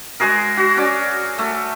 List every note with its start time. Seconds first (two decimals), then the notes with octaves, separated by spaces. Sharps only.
0.20 G#3 F#4 G#4 A#4
0.57 F#4
0.77 C#4 D5
1.38 A3